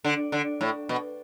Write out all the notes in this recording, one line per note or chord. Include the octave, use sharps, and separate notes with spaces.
D3
D3
A2
B2